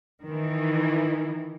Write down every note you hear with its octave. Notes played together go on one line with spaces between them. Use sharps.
D#3 E3